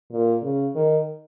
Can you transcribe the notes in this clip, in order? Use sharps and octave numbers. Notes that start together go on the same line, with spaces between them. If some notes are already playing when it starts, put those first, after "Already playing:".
A#2
C#3
D#3